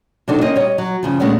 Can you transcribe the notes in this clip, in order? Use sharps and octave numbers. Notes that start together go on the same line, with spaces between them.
C3 F#3 D4 D#4 A4
A#3 C4 C#4 D#5
G3 C#5 D#5
F#3
G2 C#3 F3
A#2 G#3 A3 B3 C#4 D4